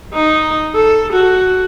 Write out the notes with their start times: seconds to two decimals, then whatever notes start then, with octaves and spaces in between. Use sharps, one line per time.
0.14 D#4
0.75 A4
1.13 F#4